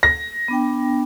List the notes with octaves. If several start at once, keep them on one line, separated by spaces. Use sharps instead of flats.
A#6
B3 D4 G5